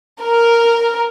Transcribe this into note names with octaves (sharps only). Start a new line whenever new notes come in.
A#4